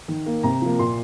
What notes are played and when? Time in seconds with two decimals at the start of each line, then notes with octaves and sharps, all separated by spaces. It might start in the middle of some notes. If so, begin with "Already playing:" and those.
0.08 D#3
0.26 A#3
0.43 C3 A#5
0.62 F3 A#3
0.79 A#2 C6